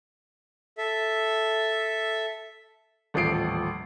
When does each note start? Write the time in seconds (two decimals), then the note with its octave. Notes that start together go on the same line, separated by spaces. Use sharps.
0.78 A4 E5
3.14 D#1 A1 F3 C7 D7